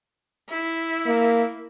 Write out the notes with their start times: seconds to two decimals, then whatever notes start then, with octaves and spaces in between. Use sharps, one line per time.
0.49 E4
1.06 A#3